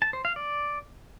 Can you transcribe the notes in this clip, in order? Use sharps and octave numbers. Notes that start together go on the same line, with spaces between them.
A5
C5
F5
D5